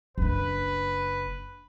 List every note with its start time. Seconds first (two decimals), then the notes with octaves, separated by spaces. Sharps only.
0.18 F#1 D4 B4